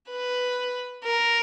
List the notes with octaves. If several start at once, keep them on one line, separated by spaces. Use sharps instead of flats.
B4
A#4